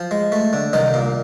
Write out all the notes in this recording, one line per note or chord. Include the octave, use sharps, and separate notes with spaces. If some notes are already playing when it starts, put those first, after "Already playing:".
Already playing: F3
G#3
A3
D3
C2 D#3 D#4
A#2